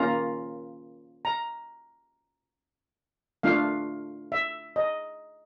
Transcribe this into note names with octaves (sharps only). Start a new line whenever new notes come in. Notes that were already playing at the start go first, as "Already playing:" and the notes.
Already playing: A#3 C#4 F4 A#5
A#5
A3 D4 F4 F5
E5
D#5